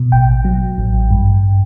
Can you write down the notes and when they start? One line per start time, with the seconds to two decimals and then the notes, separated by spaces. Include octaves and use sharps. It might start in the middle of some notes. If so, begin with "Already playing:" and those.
Already playing: B2
0.12 A1 G5
0.45 F#3
0.78 A1
1.11 G2